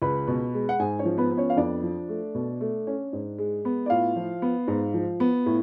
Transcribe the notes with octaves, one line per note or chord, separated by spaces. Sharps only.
C#2 B4 B5
B2
G#3
F#5
G#2 G#4 G#5
C#4 C#5
F3
B3 B4
B3
C#4 C#5
F5
F2 D4 D5
F3
A3
B2
A3
C#4
G#2
G#3
B3
D5
A2 F4 F5
F3
B3
G#2
F3
B3
A2